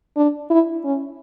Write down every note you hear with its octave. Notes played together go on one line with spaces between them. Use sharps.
D4
E4
C#4